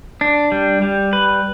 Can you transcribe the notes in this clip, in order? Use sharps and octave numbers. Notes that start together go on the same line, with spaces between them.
D4
G3
G3
B4